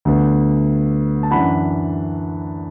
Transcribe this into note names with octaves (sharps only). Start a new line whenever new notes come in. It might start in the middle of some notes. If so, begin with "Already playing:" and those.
D2 D3 B3
A5
F#2 E3 D4 F#5 B5